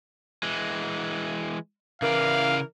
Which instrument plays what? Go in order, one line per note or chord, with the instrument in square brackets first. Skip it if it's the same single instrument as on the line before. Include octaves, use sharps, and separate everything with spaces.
[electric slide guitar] E3 G#3
[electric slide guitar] C#3 D5 [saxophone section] E3 A#4 [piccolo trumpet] F5